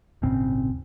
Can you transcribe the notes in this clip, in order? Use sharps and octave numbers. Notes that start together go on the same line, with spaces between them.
D#1 G#1 C#3 C4